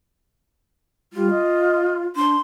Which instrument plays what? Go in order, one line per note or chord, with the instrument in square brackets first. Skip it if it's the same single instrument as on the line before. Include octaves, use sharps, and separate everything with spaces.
[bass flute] G3 [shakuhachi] F4
[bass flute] D#5
[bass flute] D4 [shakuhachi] C6